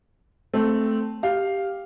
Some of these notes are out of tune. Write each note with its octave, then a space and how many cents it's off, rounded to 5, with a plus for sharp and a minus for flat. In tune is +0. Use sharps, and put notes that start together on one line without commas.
A3 +0 C4 +0
G4 +0 F5 +0